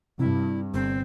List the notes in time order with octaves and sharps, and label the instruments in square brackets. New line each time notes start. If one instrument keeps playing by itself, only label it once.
[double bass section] G2 [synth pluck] C3 [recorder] E4
[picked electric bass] G1 [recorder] C4